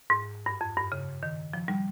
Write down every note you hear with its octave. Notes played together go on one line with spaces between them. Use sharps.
G#2
G2
F2
G2
C#3
D#3
F3
G3